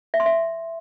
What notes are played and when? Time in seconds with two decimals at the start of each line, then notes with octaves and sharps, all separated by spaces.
0.14 E5
0.20 C6
0.26 E5